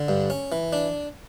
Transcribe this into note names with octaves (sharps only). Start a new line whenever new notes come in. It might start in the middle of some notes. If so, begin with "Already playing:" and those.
Already playing: D3
G2
C#4
E3
D4